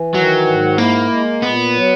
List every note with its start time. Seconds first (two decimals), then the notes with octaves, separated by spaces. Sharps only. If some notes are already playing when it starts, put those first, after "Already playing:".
Already playing: E3
0.14 D#3 F#3
0.47 G#2
0.78 A#3 E4
1.11 G#3
1.43 A#2 B3
1.75 F#3